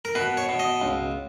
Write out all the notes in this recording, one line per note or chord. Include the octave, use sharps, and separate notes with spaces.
A#4
B2 B4
C#5
B2
D#5
C#2